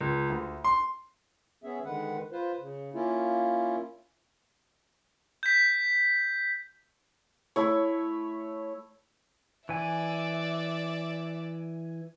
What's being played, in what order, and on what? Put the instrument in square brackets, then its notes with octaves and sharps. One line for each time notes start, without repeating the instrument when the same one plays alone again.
[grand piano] C#2
D2
C6
[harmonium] B3 C#4 G#4 E5
D3 D#3 G#3 B4 F#5
F4 B4 C5
C#3
A#3 C#4 E4 F4
[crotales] G6 B6
[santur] A3 E4 C#5
[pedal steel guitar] E3 G#5 [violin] D5 E5